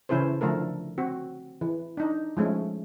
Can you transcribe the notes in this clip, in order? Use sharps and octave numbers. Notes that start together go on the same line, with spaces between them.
C#3 E3 C#4 E4 A4 C5
D3 F3 A3 A4 A#4
C4 F#4
E3
D4 D#4
F3 G#3 A3 C#4